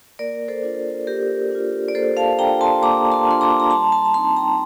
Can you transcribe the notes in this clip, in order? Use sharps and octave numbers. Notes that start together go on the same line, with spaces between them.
A#3 A#4 D5
A4 C5
D4 F4
A#3 G4 A#4
D4 F4
D5
A#3 A4 C5
F5 A5
D4 F4 G5 A#5
A5 C6
A#3 A#5 D6
A5 C6
D4 F4 C6
A#5 D6
A#5
G3 A5 C6
A5 C6
A#5
C4 D#4 A5 C6
G5 A#5